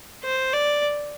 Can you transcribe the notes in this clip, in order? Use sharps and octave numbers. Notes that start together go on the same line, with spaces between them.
C5
D5